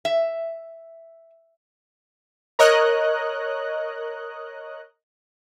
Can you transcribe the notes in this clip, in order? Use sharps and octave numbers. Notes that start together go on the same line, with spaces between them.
E5
A#4 C#5 D#5 F#6